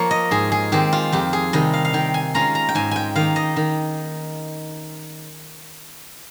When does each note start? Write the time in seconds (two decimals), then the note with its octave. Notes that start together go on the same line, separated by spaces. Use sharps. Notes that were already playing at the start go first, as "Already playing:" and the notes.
Already playing: F3 A#3 A#4 C#5
0.11 D#5
0.31 G#2 G#4
0.52 G#4
0.72 D#3 G#3 C4 G4
0.93 F4
1.12 F2 G4
1.33 G#4
1.53 C3 D#3 G3 D#5
1.73 F5
1.85 F5
1.93 D#3 G5
2.14 G#5
2.34 G#3 C#4 F4 A#5
2.55 A#5
2.69 G5
2.75 G#2 G#5
2.91 G5 G#5
3.15 D#3 A#3 F5
3.36 D#5
3.56 D#3